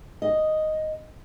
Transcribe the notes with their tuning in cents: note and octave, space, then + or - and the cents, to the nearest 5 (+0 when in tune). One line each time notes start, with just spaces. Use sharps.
D#5 +0